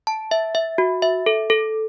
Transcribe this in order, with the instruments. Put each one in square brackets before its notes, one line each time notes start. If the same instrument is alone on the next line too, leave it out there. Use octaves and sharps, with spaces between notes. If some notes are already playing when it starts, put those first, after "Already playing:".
[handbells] A5
E5
E5
F#4
E5
A4
A4